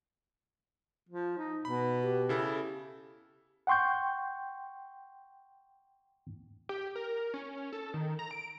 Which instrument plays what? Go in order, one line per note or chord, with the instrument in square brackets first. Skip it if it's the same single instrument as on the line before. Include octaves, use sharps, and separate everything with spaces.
[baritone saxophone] F3
D#4
[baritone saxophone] B2 [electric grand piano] B5
[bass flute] G4
[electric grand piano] C#3 E4 A4
[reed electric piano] F#5 G5 C6 C#6 G6
[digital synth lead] G4
A#4
C#4
A4
D#3
A#5
D7